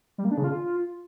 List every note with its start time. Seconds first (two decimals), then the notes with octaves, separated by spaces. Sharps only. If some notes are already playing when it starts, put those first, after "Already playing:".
0.18 G3
0.25 A#3
0.31 D4
0.38 C#3
0.44 F4